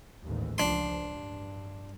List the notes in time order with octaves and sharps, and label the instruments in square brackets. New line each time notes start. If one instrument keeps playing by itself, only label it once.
[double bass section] A1 D#2 G#2
[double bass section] C#2 F3 [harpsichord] D4 C6
[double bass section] G2